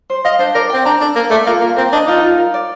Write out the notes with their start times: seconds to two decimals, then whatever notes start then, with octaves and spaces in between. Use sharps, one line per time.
0.10 C5
0.25 D#5 F5
0.39 D4 C5
0.55 A#4 D5
0.70 C4 G5
0.85 D4 A#5
1.01 D4 A4
1.15 A#3 A#4
1.31 A3 D5
1.46 A#3 F4
1.61 A#3 F4
1.76 C4 A#4
1.92 D4 D#5
2.07 D#4 F4
2.22 F4
2.38 A#4
2.54 D5